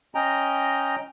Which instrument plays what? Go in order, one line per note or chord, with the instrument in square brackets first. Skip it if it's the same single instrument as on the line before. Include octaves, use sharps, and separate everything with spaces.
[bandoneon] C#4 D#5 G5 A#5